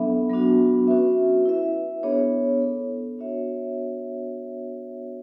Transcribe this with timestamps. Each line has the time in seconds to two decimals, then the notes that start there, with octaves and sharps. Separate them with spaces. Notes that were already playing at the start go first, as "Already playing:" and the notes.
Already playing: F#3 B3 D4 A4 E5
0.30 F#3 B3 D4 F#4
0.87 C#4 F#4 B4 E5
1.45 E4 B4 E5
2.03 B3 D4 G#4 C#5
2.61 B3 E4 A4
3.19 B3 D4 F#4 C#5 E5